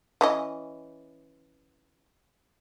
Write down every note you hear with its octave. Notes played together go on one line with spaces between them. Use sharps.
E3 C#4 D#5